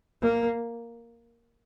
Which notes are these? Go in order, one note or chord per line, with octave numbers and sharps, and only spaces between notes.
A#3